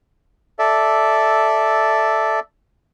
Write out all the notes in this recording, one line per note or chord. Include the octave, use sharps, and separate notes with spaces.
A4 D5 E5